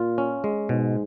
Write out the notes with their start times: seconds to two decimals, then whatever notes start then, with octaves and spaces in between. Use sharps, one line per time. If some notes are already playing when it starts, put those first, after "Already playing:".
Already playing: A#2 F4
0.18 C#4
0.44 G#3
0.69 G#2 B2